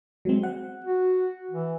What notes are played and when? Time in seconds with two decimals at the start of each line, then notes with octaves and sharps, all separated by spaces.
0.25 F#3 G#3 C4
0.43 F#5
0.84 F#4
1.51 E3